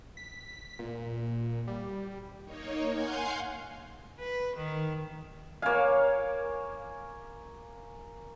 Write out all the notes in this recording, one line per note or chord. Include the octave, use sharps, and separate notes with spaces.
B6
A#2
G3
A#3 D#4 C#5
F5 F#5 G#5 C6 G6
B4
D#3
A#3 C#5 F5 G#5